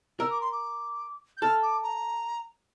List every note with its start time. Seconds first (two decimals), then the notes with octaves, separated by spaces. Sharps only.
0.19 A#4 E6
0.30 D6
0.41 C6
0.52 D6
1.37 G6
1.42 A4 F6
1.63 D6
1.83 A#5